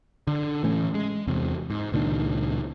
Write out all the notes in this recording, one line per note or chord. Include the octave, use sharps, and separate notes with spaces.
D3
A2 E3 A3 C#4
G#3
E2 C3
G#2
C#2 A#2 D#3 D4